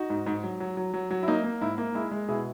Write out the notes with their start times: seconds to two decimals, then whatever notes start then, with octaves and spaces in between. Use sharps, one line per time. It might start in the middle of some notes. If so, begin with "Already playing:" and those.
Already playing: D#4 F#4
0.10 G#2
0.26 G#2
0.43 F#3
0.60 F#3
0.77 F#3
0.94 F#3
1.11 F#3
1.23 E4
1.28 A#3 D#4
1.44 A#3
1.61 G#2 E4
1.78 A#3
1.94 G#3 E4
2.11 G#3
2.29 B2 E4 G#4